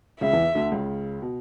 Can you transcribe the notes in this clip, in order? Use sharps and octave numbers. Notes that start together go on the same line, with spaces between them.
C#2 C#3 E5
E2 E3
D2 D3
C#2 C#3
B2